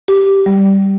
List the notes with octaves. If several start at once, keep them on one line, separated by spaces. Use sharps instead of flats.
G4
G3